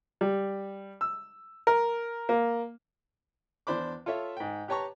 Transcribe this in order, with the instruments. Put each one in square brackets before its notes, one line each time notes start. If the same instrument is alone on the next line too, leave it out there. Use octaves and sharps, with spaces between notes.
[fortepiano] G3
E6
A#4
A#3
E2 D4 C5 B5 D6
F4 A4 C#5 E5
G#2 G5
G4 B4 C#5 A5 A#5 C#6